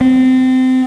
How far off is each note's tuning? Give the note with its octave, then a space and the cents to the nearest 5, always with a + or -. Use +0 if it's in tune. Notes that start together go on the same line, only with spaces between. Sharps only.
C4 -25